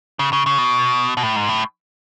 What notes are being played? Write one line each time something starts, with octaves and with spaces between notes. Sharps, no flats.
C#3
C#3
C#3
B2
B2
A2
G#2
A2